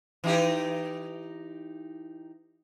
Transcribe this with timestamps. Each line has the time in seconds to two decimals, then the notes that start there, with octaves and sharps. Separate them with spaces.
0.24 E3 D#4 G4